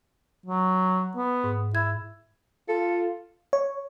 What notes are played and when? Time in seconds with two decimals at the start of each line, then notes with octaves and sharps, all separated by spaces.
0.46 F#3
1.16 B3
1.44 G#2
1.75 E4 G#6
2.69 F4 A4
3.53 C#5